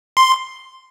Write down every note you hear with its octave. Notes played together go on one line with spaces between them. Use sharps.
C6